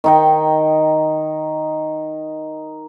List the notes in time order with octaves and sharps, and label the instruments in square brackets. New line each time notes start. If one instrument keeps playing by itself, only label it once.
[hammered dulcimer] D#3 D#4 G5